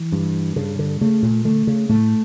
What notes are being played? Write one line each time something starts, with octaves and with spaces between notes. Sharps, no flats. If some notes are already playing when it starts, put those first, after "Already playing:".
Already playing: E3
G2
G2 C#3
D3
C#3 A3
A#2
D3 A3
C#3
A2 A3